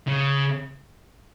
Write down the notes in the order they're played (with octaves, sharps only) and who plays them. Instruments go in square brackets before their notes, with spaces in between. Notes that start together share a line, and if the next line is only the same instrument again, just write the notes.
[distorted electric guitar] C#3